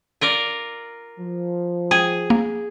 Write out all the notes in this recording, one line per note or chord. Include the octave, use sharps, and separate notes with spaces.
F4 A#4 D5
F3
G#4 G5
A#3